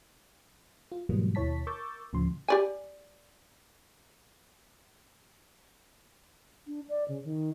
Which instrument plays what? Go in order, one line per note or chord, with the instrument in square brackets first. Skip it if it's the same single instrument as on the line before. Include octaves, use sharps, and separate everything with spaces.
[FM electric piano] F4
G#2 B2 E3 F#3 G3 A#3
D#2 B2 E4 C#5 A5 B6
A#4 C#6 D6 E6 G6 A6
D2 A2 C#3 F3 C6
[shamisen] G4 D5 G#5
[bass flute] D4
D5
C#3
D#3